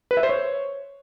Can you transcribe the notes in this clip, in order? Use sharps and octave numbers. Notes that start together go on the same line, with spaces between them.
B4
E5
C5
C#5